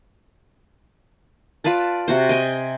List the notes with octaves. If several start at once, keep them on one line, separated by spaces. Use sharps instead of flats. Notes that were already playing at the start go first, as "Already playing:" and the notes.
F4 B4 D5 A5
C3 F#4 C5
D#5 G5 G#5